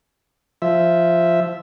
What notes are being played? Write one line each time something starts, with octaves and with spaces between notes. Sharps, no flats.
F3 E5